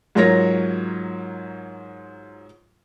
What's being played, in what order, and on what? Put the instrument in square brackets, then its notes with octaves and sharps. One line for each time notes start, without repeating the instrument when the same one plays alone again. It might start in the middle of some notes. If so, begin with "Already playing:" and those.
[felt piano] G#2 F#3 F4 A#4 C#5 A#6